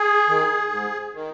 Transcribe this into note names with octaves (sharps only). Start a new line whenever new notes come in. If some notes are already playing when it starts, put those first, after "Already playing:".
Already playing: G#4
D#3
G#2
D#3